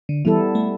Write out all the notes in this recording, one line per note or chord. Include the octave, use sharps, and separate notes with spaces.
D3
E3 G3 B3 E4 A4
A3